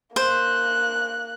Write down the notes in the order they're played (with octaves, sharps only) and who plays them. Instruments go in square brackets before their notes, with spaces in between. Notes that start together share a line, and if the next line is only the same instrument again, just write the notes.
[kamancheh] A#3 F#6 [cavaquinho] C5